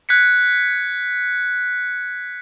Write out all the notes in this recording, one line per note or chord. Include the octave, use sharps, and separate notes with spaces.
F#6 G#6 B6 C#7